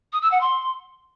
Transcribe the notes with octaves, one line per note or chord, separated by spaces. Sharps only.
D#6
E6
F#5
C6